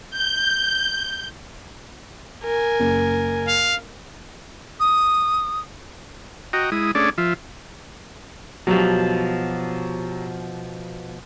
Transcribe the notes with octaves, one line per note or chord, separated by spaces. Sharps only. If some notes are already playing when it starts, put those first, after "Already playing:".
G6
A#4 G#5
F#1
F5
D#6
F#4 D#5 G5 A#5
G#3 E4 D#6
A3 C#4 D4 G#4 D5
F3 F4 E5
B2 F3 F#3 G4